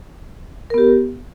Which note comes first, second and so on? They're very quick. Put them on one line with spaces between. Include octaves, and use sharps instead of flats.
A#4 B3 G4